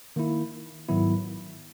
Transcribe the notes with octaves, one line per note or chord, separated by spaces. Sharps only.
D#3 A#3 E4
G#2 D#3 F#3 B3 E4